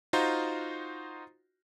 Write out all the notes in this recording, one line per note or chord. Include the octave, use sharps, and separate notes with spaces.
D#4 F4 F#4 C5 A#5